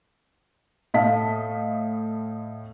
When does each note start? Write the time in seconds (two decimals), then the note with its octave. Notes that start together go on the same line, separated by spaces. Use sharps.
0.94 A2 A3 D#5 F5 A5 B6